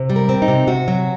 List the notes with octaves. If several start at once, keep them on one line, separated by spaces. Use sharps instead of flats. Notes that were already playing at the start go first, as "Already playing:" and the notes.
Already playing: C3
G3
A#4
C4
D#4
C3
C3 F#4
F#3